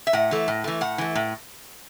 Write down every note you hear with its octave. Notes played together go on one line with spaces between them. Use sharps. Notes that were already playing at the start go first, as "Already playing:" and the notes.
E5
A2 F#5
E3 A3
A2
E3 A3
A2 F#5
E3 A3
A2